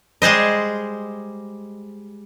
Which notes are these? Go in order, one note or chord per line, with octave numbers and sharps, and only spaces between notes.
G3 G#3 G#4 C5 D#5